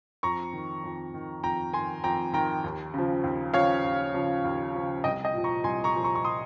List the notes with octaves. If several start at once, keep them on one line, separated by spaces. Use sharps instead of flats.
F2 A#5 C#6
D#3
F2
D#3
F2 G5 A#5
D#3 G#5 C6
F2 G5 A#5
D#3 G5 A#5
D#2
C#3 F3
D#2
C#3 F3 C#5 F5
D#2
C#3 F3
D#2
C#3 F3
C2 D#5 G5
D#5 G5
A#2 F3
A#5 C#6
C2 G#5 C6
A#5 C#6
A#2 F3
A#5 C#6
C#6
C6 D#6